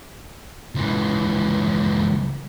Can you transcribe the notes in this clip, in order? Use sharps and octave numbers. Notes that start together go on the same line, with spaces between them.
C#2 E3